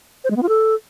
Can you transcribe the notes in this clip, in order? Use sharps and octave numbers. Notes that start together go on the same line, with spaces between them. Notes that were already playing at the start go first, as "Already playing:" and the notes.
C5
G#3
B3
F4
A4